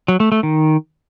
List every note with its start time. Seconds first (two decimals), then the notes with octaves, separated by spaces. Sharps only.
0.08 F#3
0.20 A3
0.32 A3
0.43 D#3